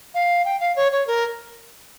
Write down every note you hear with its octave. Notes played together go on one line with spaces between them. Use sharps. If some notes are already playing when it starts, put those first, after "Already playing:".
F5
G5
F5
C#5
C#5
A#4